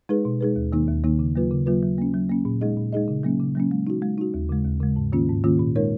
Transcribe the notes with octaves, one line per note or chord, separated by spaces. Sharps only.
G#3 D#4 G#4 B4
B2
G#3 D#4 G#4 B4
D#2
D#3 A#3 D#4
D#2
D#3 A#3 D#4
C#3
F#3 A#3 F4 B4
C#3
F#3 A#3 F4 B4
F#3
A#3 C#4
F#3
A#3 C#4
A#2
G#3 D#4 G#4 D#5
A#2
G#3 D#4 G#4 D#5
C#3
F#3 A#3 C#4
C#3
F#3 A#3 C#4
G#3
D#4 F#4
G#3
D#4 F#4
D#2
C#3 G#3
D#2
C#3 G#3
G#2
D#3 A#3 C#4 F4
G#2
D#3 A#3 C#4 F4
A#2
G#3 D#4 A#4 C#5